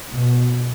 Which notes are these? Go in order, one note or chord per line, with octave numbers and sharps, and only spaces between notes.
B2